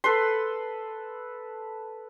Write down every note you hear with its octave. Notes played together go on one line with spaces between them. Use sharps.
A4 B4 C6